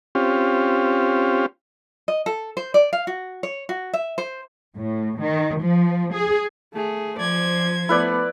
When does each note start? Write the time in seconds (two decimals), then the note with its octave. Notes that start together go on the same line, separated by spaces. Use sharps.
0.15 C4 C#4 F4 G4
2.08 D#5
2.26 A4
2.57 C5
2.74 D5
2.93 F5
3.07 F#4
3.43 C#5
3.69 F#4
3.93 E5
4.18 C5
4.76 A2
5.21 D#3
5.61 F3
6.14 G#4
6.74 A3 G#4
7.19 F3 C5 D5 G#6
7.89 A3 B3 E4 B4 D5